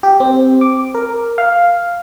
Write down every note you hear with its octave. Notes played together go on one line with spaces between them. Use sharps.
G4
C4
D6
A#4
F5